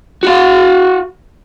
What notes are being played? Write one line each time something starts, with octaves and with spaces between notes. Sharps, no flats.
F#4 F5